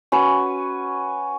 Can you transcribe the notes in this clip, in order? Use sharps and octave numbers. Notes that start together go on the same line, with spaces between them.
C#4 F#4 B4